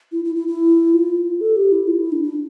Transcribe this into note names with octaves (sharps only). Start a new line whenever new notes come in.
E4
E4
E4
E4
F4
A4
G4
E4
F4
E4
D4
D4